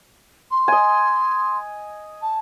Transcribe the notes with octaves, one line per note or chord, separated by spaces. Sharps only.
C6
D#5 G#5
A5